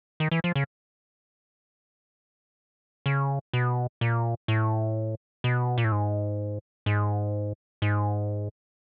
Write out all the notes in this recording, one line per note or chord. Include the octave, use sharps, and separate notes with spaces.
D#3
E3
F3
C#3
C#3
B2
A#2
A2
B2
A#2
A2
G#2
G#2
G#2